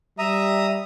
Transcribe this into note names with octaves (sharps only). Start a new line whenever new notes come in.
G3 E5 A#5 D#6